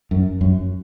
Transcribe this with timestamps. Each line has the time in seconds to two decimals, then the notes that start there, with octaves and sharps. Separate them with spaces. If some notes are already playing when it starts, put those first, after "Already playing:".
0.11 F#2
0.41 F#2